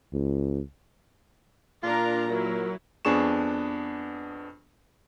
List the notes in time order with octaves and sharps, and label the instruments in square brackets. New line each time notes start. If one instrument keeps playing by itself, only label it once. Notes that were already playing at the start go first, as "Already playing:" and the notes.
[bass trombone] C#2
[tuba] A#2 [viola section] D4 A#4 A#5 [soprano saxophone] F4
[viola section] F#3 E4 [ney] A#4
[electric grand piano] F2 B3 D4 G#4 C#6 E7